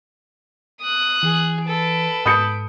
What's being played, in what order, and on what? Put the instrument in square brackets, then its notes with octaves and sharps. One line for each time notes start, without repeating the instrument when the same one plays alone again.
[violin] D#6 F#6
[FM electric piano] E3 [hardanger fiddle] G#4
[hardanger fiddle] A4 B4 [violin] D7
[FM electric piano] G#2 [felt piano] D#6 G6 C#7